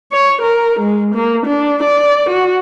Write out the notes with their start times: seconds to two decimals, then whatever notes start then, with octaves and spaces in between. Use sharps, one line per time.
0.12 C#5
0.42 A#4
0.80 G#3
1.15 A#3
1.46 D4
1.83 D5
2.29 F#4